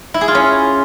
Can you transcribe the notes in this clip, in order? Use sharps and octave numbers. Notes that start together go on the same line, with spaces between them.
E4
G#4
F4
C#4